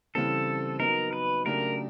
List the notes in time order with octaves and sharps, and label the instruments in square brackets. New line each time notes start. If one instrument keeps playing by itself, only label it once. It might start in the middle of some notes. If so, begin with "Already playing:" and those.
[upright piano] C#3 E3 G3 C4 [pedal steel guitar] A4
[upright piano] F#3 B3 D#4 [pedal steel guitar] A#4
[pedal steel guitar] B4
[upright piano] C#3 F#3 A3 D4 G4 [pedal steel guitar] A#4